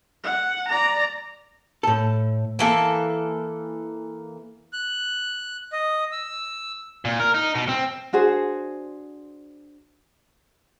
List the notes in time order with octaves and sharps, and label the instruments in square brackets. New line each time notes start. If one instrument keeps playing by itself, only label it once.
[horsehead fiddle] F#5
D5 A#5
[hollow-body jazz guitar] A2 A4
[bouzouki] E3 A#3 A4
[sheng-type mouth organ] F#6
D#5
E6
[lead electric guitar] A#2
A#4
D#4
B2
C4
[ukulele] D4 F#4 G#4 C5